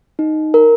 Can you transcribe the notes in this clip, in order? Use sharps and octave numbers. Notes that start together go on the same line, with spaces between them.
D#4
A#4